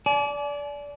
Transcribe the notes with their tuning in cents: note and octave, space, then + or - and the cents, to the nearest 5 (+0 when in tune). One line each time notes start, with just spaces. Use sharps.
D5 -20 G#5 +45